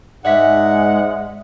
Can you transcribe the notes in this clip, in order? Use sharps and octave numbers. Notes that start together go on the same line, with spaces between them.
G#2 G#3 D5 E5 F#5 B6